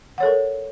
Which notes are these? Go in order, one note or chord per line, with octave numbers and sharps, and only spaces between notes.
A4 A#4 C#5 F#5